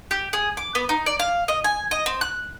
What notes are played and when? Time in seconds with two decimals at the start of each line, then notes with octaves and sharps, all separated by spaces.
0.11 G4
0.33 G#4
0.57 D6
0.75 B3
0.89 D#4
1.06 D5
1.20 F5
1.48 D#5
1.64 G#5
1.91 D#5
2.06 C4
2.21 F#6